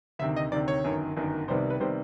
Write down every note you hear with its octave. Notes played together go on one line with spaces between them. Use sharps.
D2 C3 D#3 E5
D#5
D2 C3 D#3 D5
C#5
G1 F#2 D#3
G1 F#2 D#3
C2 C3 D#3 G3 B3 C5
B4
C3 D#3 G3 B3 C5